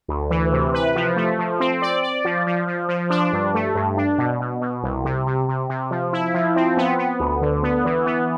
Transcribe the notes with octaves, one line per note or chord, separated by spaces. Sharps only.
D2
E3
C3
B4
F3
A3
F3
C4
D5
D5
F3
F3
F3
F3
D4
G2
A3
G2
D4
B2
B2
B2
C2
C3
C3
C3
C3
F3
E4
F3
C4
B3
B3
D2
D3
B3
E3
B3